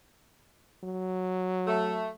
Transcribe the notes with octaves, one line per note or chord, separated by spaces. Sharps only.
F#3
A3